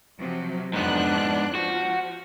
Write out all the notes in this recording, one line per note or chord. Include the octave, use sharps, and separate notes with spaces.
C3 F3 F#3
F2 G#2 B3 D4 F#6
F3 F#4